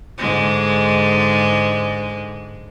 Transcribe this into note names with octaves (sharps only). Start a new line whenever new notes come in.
G#2 D3 G#3